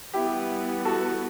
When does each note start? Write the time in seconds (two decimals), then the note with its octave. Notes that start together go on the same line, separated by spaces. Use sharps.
0.14 E3 G3 B3 E4 G4
0.85 F#4 A4